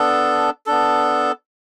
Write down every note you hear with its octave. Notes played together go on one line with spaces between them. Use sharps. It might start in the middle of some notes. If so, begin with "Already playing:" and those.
Already playing: B3 D4 A4
B3 D4 A4